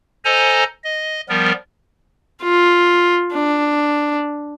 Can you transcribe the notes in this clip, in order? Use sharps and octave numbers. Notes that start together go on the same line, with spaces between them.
A4 C5 D#5 G#5 A#5
D#5
F3 G3 B3 A#4
F4
D4